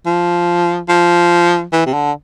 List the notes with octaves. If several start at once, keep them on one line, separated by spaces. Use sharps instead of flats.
F3
F3
E3
C3
D3